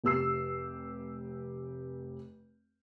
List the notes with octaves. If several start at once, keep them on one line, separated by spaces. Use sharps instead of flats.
F1 G4 E6 C7